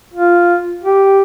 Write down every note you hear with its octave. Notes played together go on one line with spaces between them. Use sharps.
F4
G4